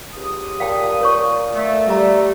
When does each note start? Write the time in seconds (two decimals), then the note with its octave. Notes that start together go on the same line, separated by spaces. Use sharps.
0.14 C#2 G4 D#6
0.60 A#2 F5 G5 A5
1.01 A#4 C#5 C#6
1.55 A3
1.88 G3 E5 A#5